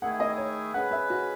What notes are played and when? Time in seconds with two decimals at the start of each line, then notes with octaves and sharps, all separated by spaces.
0.02 D#3 A3 E4 G#4 F#5
0.20 D#5
0.38 C#5
0.74 C#3 G#3 C#4 G#4 B4 F#5
0.91 E5
1.10 F#4